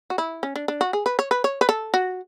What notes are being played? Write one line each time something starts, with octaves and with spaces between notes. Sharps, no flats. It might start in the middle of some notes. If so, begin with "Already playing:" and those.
F#4
E4
C#4
D4
D4
F#4
G#4
B4
C#5
B4
C#5
B4
A4
F#4